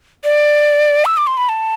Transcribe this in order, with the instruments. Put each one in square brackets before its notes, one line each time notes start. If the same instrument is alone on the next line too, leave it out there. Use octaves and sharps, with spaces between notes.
[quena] D5
E6
D6
C6
B5
A5